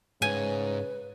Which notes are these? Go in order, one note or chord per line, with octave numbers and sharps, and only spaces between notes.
G#2 C#3 B4 G#5